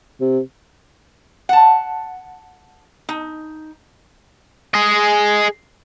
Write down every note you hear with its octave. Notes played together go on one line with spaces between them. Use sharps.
C3
F#5 A5
D#4
G#4 D#5